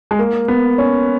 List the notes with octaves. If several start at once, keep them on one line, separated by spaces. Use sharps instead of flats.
G#3
A#3
B3
C#4